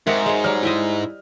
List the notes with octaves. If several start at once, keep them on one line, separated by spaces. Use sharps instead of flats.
G#2 C4 F#4 G4 A#4 E5
G#3 C5 C#5
F#3 G3 F6
E4 D#5 E5 G5